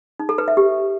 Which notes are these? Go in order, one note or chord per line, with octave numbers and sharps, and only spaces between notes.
D#4
A4
B4
E5
G4